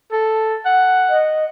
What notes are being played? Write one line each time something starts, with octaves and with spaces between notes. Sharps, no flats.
A4
F#5
D#5